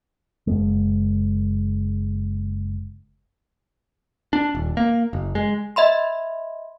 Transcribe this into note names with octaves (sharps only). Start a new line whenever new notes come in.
F#1 G#3
D4
D#1
A#3
F#1
G#3
D#5 E5 B5 C6